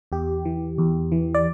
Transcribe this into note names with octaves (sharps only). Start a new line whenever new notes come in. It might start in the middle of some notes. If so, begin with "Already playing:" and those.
E2 G4
E3
E2
E3
D5